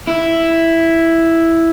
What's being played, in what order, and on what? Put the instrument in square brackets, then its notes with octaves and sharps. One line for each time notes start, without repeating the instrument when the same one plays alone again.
[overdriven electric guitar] E4